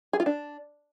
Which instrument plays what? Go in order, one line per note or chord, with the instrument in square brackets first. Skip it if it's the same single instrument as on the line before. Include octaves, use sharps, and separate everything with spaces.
[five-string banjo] G#4
F4
D4